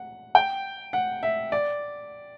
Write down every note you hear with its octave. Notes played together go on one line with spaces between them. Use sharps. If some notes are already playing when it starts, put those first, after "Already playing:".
Already playing: F#5
G5
F#5
E5
D5